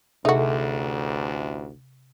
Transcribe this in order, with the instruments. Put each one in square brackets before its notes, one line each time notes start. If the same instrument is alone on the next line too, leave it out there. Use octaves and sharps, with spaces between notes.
[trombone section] A1 D2 [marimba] C3 [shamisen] D#4 F#4 [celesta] G#4 A4 E5